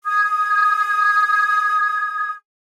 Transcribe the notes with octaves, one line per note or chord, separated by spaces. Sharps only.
D#6 G#6